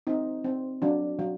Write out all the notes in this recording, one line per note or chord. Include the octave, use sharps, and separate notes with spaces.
C4 D#4
C4
F#3 D4
F#3